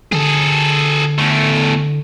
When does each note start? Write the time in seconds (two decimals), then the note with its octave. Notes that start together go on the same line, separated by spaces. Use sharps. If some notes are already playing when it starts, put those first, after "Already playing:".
0.12 D3 G#4 A4
1.19 E2 A3